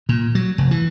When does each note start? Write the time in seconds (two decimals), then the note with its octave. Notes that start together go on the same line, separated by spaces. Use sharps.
0.09 A#2
0.35 F#3
0.58 F1
0.71 E3